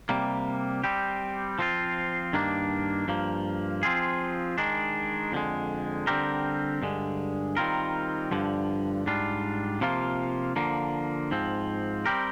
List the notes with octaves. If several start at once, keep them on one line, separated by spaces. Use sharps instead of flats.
C3 G3 A#3
G3 C4 G4
F3 C4 F4
G2 D#3 A#3 D4
G2 F3 A#3
F3 C4 F4 G#4
D#3 G#3 D4
F2 D3 G#3
D3 G3 C4 G4 A#4
G2 D3 G#3
D#3 G3 C4 F4 A#4
G2 D3 F3
G#2 G3 D4 F4
C3 F3 A#3 F4
D3 F3 A#3
G#2 F3 C4
G3 C4 G4 A#4